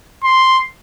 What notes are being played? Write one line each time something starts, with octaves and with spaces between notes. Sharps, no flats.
C6